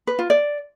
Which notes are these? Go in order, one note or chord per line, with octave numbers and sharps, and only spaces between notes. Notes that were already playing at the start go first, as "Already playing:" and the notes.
B4
F4
D5